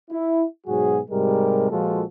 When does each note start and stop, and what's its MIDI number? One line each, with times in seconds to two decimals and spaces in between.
0.10 0.44 64
0.67 0.99 44
0.67 0.99 47
0.67 0.99 54
0.67 0.99 66
0.67 0.99 68
1.10 1.69 44
1.10 1.69 48
1.10 1.69 55
1.10 1.69 56
1.10 1.69 70
1.70 2.03 46
1.70 2.03 53
1.70 2.03 56
1.70 2.03 65
1.70 2.03 66
1.70 2.03 69